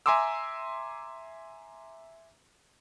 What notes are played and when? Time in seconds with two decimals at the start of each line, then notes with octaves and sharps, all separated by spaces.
0.06 E5 G#5 A#5 C6 D6 E6